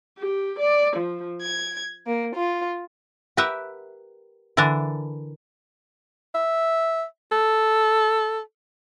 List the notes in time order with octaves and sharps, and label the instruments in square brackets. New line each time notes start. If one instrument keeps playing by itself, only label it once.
[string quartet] G4
D5
F3
G#6
A#3
F4
[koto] G4 A#4 B4 E5 F#5
D3 E3 D4 A#4 A5
[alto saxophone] E5
A4